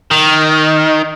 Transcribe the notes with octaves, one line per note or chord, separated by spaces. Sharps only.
D#3